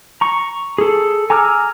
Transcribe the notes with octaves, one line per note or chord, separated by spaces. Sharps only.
A#5 C#6
G#4 A4
G#5 A#5 D6 E6 F6